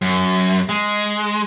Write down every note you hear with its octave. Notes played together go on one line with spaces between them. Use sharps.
F#2
G#3